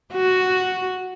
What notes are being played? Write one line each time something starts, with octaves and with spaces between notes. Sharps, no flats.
F#4